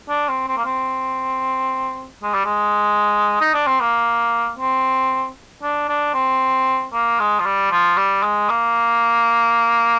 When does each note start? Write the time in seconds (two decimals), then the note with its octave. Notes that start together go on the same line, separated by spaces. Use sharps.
0.09 D4
0.29 C4
0.48 C4
0.57 A#3
0.65 C4
2.23 G#3
2.34 G3
2.45 G#3
3.41 D#4
3.54 D4
3.67 C4
3.80 A#3
4.58 C4
5.62 D4
5.89 D4
6.14 C4
6.93 A#3
7.20 G#3
7.40 F3
7.45 G3
7.71 F3
7.97 G3
8.23 G#3
8.49 A#3